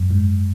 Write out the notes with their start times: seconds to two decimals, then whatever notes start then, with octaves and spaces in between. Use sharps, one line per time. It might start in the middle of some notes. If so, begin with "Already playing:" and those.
Already playing: F#2
0.11 G#2